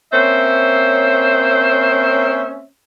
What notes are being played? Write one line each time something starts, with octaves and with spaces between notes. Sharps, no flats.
A#3 C4 C#4 C5 C#5 E5